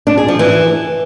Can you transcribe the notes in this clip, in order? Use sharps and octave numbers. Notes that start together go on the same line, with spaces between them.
D4
G#4
F3
E3